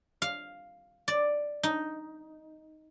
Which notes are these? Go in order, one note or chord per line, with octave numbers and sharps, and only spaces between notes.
F5
D5
D#4